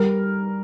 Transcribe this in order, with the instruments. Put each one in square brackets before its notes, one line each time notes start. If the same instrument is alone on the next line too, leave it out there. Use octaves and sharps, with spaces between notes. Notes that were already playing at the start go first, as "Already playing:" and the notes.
Already playing: [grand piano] G3 [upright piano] A#4